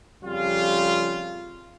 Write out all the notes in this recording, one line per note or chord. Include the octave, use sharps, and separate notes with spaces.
F2 C#3 G3 F4